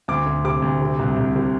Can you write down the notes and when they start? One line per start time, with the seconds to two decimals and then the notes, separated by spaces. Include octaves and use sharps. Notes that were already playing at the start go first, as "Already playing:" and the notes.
0.08 D2 D6
0.26 D2
0.44 C3 D6
0.62 D2
0.81 C3
0.99 C2
1.16 C2
1.35 C3